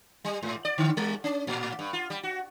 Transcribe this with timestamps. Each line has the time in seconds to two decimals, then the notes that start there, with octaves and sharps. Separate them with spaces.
0.25 G3
0.42 G#2
0.65 D5
0.78 D3
0.97 G3
1.24 C#4
1.47 A2
1.79 G2
1.93 F4
2.10 G3
2.23 F#4